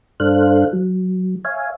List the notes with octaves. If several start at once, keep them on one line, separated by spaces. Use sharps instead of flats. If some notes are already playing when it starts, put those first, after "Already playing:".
G2 D4 A4 C5 F5 F#6
F#3
C#5 E5 F5 G#5